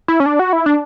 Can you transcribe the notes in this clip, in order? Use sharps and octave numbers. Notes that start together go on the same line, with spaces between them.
E4
C#4
D4
F#4
E4
D4